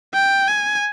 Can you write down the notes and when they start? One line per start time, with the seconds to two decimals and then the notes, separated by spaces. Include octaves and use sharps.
0.14 G5
0.47 G#5